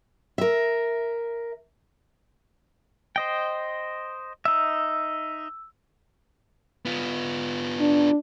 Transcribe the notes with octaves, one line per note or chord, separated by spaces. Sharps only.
A#4 E5
C5 D#5 G5
D#4 E5 E6
B3 F4
D4